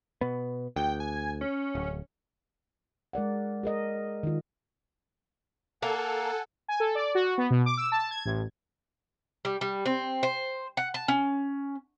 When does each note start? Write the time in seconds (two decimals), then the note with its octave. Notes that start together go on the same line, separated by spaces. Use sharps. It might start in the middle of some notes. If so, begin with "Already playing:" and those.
0.21 B2 B3
0.76 D2 G5
1.00 G#5
1.41 C#4
1.75 D1
3.13 G#3 A#4 D5 F#5
3.63 G#4 A#4 D#5
4.23 D#3 F4
5.82 A#3 A4 F#5 G#5
6.68 G#5
6.80 A4
6.95 D5
7.15 F#4
7.38 B3
7.50 B2
7.66 D6
7.77 E6
7.92 A5
8.11 G#6
8.25 A1
9.45 G3
9.61 G3
9.86 C4
10.23 C5
10.77 F#5
10.94 A5
11.08 C#4